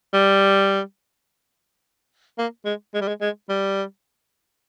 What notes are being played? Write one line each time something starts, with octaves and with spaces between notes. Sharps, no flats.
G3
A#3
G#3
G#3
G3
G#3
G#3
G3